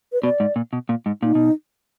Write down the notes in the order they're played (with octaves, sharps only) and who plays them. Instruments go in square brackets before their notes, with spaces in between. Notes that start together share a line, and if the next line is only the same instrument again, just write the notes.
[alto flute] B4
[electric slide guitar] B2 [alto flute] D5
[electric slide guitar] G#2
A#2
B2
A#2
G#2
[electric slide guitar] A#2 [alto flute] D#4
[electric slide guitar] B2